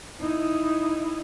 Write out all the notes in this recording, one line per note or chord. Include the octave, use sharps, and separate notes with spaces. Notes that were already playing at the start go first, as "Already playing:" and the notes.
D#4 E4